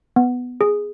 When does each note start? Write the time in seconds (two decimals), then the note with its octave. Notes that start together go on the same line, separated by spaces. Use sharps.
0.16 B3
0.61 G#4